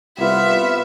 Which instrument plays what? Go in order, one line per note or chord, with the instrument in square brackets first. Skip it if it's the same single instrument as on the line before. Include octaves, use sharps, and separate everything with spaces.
[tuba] C2 [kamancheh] B3 [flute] F4 [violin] E5